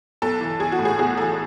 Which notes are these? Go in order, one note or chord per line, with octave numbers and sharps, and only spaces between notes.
B1 A4
E3
B1 G#4
F#4
A2
G#4
B1 G#4
E3 A4